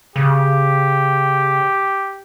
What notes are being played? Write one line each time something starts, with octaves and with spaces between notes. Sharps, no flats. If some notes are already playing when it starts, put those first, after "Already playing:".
C#3 G4